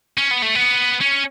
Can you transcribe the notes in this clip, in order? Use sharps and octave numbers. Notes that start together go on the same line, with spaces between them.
C#4
B3
A3
B3
C#4